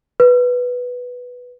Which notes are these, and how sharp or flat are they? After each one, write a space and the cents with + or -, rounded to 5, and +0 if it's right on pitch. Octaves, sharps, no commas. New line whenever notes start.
B4 -5